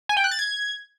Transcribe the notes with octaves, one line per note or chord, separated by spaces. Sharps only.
G#5
G5
F#6
A6
G#6